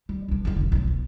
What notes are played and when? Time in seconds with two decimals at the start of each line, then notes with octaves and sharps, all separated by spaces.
0.09 G3
0.28 B1 D4
0.45 E2 D3
0.56 F1 C#2
0.72 B1 F4
0.87 B3